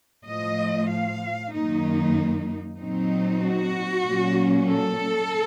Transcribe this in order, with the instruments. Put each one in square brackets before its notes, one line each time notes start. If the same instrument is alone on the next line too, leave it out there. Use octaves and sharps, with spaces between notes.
[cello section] A2 F3 A3 D#5
F5
F#2 D#3 A#3 D#4
A#2 F#3 C4 D#4
F#4
A#2 F#3 A#3 C#4
A4